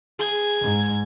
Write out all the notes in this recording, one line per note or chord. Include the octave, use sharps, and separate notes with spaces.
G#4 G#6
G#2